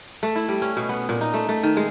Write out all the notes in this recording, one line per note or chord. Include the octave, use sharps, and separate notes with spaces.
A3
E4
G3
C#4
B2
B3
A#2
D#4
A3
A3
D#3
G#3